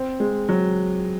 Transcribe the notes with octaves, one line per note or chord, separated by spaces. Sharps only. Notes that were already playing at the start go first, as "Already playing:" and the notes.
Already playing: C4
G#3
F#3